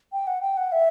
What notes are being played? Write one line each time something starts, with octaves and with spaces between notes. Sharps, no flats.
G5
F#5
G5
F#5
E5